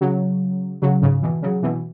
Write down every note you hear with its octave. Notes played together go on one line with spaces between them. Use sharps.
C#3 F#3
C#3 F#3
G#2 C#3
B2 E3
C#3 F#3
B2 E3